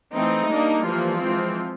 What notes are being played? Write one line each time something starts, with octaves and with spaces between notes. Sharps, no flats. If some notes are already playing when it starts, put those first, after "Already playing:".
E3 A3 C4 D#4
G3 A#3 D4
E3 F3 G3 A#3 F4
E3 G#3 C4